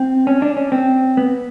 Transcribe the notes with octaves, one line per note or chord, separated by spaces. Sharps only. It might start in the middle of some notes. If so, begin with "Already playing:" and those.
Already playing: C4
C#4
D4
C#4
C4
B3